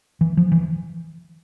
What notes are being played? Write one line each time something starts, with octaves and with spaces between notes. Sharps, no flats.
E3
F3
E3